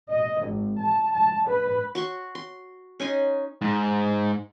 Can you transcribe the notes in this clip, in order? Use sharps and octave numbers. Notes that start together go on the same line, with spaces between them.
D#5
G#1
A5
A5
B4
F#4 C6 C#6
C6
C#4 D#4 G#5 C6
G#2